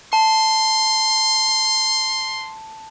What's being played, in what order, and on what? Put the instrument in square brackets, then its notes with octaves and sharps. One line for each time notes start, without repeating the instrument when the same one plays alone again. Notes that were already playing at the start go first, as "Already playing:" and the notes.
[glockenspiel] A5 [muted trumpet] C6